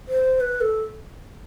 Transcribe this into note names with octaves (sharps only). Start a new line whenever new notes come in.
C5
B4
A4